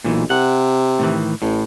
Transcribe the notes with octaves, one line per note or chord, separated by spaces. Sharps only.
B1 A#2 E3
C3 F#5
A2 D#3 E3
A1 A2